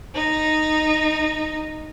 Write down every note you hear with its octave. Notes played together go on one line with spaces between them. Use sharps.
D#4